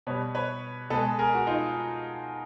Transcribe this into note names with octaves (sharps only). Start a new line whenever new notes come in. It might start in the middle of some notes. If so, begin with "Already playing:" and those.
B2 G3 B4 C#5
B4 C#5
B2 G#3 A4 B4
G#4 A#4
F#4
D#4 F4